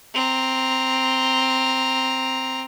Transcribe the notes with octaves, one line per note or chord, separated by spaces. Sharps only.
C4 A#5